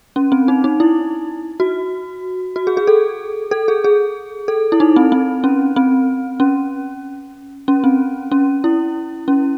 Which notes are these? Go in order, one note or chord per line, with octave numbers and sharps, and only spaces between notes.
C#4
C4
D#4
D#4
E4
F#4
F#4
G#4
G#4
A4
A4
G#4
G#4
A4
E4
D#4
C4
C4
C#4
C4
C#4
C#4
C4
C#4
E4
C#4